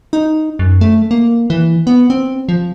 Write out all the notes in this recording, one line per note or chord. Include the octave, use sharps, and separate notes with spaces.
D#4
F#2
A3
A#3
E3
B3
C4
F3